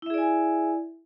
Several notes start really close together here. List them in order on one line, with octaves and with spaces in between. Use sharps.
E4 E5 G#4 D5 G#5